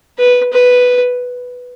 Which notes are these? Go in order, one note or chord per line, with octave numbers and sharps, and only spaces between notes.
B4
B4